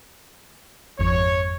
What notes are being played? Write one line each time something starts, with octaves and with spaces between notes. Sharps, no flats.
G#1 F2 C#5